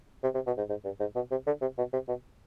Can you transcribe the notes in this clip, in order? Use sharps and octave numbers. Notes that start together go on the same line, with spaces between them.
C3
C3
B2
G#2
G#2
G2
G#2
B2
C3
D3
C3
B2
C3
B2